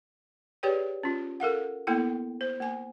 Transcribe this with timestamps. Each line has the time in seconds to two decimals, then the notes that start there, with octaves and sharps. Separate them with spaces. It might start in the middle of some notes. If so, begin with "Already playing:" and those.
0.63 G4 G#4 B4 C#5 D5 G5
1.03 C#4 F4
1.40 A4 A#4 F5 F#5
1.87 A#3 B3 E4 A4 G5
2.41 C5
2.60 A#3 G#5